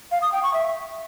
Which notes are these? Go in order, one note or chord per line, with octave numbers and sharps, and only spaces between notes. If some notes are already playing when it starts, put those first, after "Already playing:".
F5
D#6
G5
C#6
E5